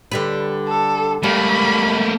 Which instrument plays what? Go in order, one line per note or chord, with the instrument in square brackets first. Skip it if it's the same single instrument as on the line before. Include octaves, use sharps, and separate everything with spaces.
[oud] D3 G3 B4
[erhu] A4
[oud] G3 [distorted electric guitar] A3 A#3 [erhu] B5